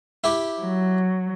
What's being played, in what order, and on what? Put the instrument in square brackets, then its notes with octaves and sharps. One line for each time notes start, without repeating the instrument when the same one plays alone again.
[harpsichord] E4 G4
[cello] F#3